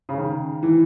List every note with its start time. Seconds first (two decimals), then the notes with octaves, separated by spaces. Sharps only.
0.09 C#3
0.18 D#3
0.63 E3